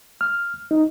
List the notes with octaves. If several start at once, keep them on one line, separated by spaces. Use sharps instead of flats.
F6
D#4